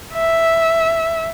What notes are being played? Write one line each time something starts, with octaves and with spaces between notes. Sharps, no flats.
E5